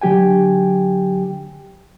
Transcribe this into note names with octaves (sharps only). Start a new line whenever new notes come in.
D3 F#3 G4 G5 G#5